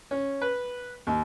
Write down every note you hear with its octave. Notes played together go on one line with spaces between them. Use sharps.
C#4
B4
D#2